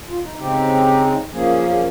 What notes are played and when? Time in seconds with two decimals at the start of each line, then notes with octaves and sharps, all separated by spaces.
0.08 F4
0.23 D#4
0.38 C#3 G#3 C4 D#4 G4
1.32 F3 A#3 C#4 G#4
1.69 G#4